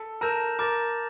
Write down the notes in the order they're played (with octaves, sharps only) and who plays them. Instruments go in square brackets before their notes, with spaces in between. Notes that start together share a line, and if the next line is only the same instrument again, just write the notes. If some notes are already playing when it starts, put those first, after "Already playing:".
Already playing: [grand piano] A4
[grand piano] A#4 [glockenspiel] A5 E6 G6 A#6 E7
[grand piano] A#4 [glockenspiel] D6 A6 E7